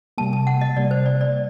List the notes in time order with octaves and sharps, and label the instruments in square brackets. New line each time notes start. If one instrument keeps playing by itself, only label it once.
[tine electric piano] C3 G3 A#3 [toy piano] A5
[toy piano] A5
F#5
D#5
[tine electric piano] C3 G3 A#3 [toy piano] D5
[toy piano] C5
D5
D5